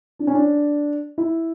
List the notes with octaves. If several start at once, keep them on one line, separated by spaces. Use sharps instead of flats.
D4
C#4
D4
E4